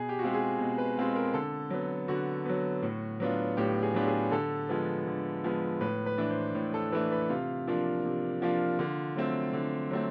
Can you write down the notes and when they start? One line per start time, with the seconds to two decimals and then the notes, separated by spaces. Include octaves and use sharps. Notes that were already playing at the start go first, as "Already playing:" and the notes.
Already playing: B2 G#4
0.09 G4
0.19 F#4
0.22 G#3 C4 F4 G4
0.34 G#4
0.59 B2
0.78 B4
0.97 G#3 C4 F4
1.16 A#4
1.34 D3 A4
1.70 F#3 B3
2.08 D3 F#4
2.45 F#3 B3
2.82 A2
3.20 F#3 B3 D4 F4
3.57 A2 G4
3.82 G#4
3.94 F#3 B3 D4 F4 G4
4.07 G#4
4.31 D3 A4
4.69 F3 G#3 B3
5.07 D3
5.44 F3 G#3 B3
5.81 A2 B4
6.06 B4
6.18 E3 A3 D4
6.30 C5
6.55 A2
6.74 A4
6.92 E3 A3 D4 B4
7.12 B4
7.30 C3 F4
7.67 F3 A#3 D4 F4
8.05 C3
8.42 F3 A#3 D4 F4
8.79 D3 F4
9.16 F#3 A3 C4
9.53 D3
9.91 F#3 A3 C4